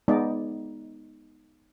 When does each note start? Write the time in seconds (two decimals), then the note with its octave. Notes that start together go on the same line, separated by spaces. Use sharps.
0.08 G#3 B3 D#4 D5